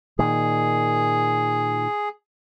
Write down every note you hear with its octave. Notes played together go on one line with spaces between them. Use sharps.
A#2 D#3 G#4